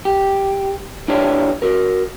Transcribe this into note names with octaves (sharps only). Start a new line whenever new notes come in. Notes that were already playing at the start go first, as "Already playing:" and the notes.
G4
D4 E4 F4 G4 C#5 D5
F#4 A#4